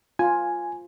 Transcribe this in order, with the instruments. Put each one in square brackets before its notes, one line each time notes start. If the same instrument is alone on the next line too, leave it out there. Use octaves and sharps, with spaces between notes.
[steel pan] F4 [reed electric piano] G#5